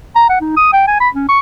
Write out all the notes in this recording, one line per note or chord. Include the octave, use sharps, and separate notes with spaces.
A#5
F#5
D#4
D#6
G5
G#5
B5
C#4
C#6